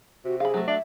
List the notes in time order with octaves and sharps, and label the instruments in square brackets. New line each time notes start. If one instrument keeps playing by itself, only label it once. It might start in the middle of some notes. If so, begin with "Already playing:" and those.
[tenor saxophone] C3 [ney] F#4
[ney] G#4 [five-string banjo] F5 B5
[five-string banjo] F#3 A3
[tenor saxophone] D4 [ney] E5